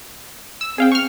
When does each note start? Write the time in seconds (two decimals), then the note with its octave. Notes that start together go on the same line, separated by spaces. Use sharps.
0.61 E6
0.78 C4 G#4 F5 G5
0.92 C#6 F6